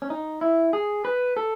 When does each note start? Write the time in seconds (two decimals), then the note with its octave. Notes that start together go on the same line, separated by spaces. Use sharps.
0.02 C#4
0.10 D#4
0.41 E4
0.73 G#4
1.05 B4
1.37 A4